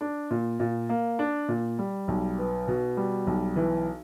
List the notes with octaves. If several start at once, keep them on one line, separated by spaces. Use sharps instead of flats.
D4
A#2
A#2
A#3
D4
A#2
G3
B1
B3
B2
G3
B1
E3